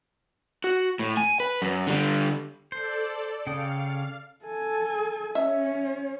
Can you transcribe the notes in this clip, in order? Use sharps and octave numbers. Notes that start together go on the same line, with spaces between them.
F#4
A2
G#5
B4
F#2
D3 G3
A4 C5 D5
C#3 F5 G5 D#6
A4 G#5
C#4 C#5 E5